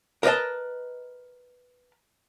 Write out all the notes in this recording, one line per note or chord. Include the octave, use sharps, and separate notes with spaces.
A#4 B4 D5 D#5 A5